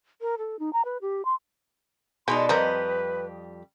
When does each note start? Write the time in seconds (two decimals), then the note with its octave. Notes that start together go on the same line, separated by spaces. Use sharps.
0.21 A#4
0.38 A4
0.59 D#4
0.73 A#5
0.85 B4
1.02 G4
1.25 C6
2.28 B2 G#3 D4 D#4 A4 C6
2.49 F2 G3 C4 A#4 B4 D#5